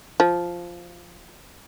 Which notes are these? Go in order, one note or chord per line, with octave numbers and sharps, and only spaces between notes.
F3